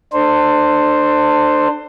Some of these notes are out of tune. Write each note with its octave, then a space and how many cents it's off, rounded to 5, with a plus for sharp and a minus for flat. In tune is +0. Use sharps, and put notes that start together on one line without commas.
D4 +25 A4 +25 C5 +0